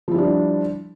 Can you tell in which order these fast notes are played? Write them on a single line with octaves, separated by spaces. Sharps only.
F3 E4 G3 D4